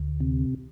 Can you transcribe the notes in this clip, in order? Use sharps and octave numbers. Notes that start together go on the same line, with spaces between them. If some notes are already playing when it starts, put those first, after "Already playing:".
Already playing: D2
C3